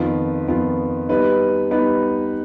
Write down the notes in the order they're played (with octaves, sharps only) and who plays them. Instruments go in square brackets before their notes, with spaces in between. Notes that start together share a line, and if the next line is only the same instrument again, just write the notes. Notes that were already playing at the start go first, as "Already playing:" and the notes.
Already playing: [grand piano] F2 D#3 B3 F4
F2 D#3 B3 F4
G3 B3 D#4 B4
G3 B3 D#4 B4